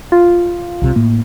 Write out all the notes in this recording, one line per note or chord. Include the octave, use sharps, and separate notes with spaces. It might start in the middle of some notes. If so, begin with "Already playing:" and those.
F4
C2 C3
A2 A#3